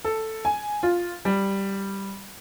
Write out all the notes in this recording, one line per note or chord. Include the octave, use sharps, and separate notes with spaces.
A4
G#5
F4
G3